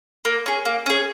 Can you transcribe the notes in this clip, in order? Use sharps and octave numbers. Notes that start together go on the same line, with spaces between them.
A#3
C#4 G#4
A#3
C#4 G#4